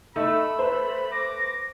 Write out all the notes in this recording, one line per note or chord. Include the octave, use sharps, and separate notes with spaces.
A3 D#4 B5 E6
B4 C5
D6 A#6